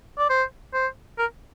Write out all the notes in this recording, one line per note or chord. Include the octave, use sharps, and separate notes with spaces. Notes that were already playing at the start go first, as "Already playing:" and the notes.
D5
C5
C5
A#4